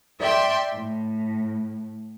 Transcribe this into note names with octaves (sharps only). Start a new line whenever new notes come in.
D5 E5 G5 C6
A2